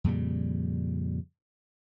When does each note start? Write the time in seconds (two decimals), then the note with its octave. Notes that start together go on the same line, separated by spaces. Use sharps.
0.04 F2 A#2 C#3 G3